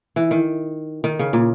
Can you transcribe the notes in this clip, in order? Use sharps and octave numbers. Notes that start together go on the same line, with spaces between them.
E3
D#3
D#3
C#3
A#2